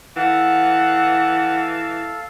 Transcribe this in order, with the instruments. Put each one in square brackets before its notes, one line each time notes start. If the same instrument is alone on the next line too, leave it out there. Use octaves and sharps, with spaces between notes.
[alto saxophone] E3 [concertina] A4 F5 [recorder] F#5